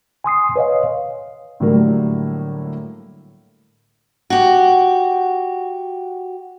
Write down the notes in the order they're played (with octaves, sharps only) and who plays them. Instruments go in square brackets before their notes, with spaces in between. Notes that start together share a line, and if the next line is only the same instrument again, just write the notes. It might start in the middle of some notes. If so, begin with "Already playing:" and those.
[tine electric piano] G#5 C6 D#6 C7
B4 C#5 D#5 F5
[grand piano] A2 D3 F#3 G3 A3 A#3
[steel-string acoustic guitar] F#4 G4